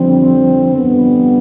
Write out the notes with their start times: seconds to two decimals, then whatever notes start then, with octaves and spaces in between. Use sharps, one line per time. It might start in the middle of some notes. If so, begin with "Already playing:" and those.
Already playing: F2 D3 F3 G3 C4
0.74 F2 D3 G3 B3